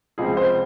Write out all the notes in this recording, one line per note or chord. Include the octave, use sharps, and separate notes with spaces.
C#2 C3 F3 G#3 G#4
C5